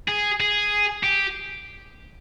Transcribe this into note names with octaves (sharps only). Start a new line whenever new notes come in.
G#4
G#4
G4